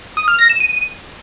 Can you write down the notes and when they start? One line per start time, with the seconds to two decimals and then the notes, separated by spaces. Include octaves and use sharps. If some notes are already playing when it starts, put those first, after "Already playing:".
0.17 D#6
0.28 F6
0.39 A#6
0.49 E7
0.60 D#7